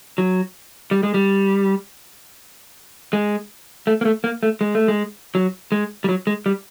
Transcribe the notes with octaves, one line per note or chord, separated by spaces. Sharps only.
F#3
G3
G#3
G3
G#3
A3
A#3
A3
A#3
A3
G#3
A3
G#3
F#3
G#3
G3
F#3
G#3
G3